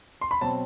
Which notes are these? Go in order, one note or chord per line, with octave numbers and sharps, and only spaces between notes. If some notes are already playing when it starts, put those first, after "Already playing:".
C6
B5
B2 F#3 C4 A5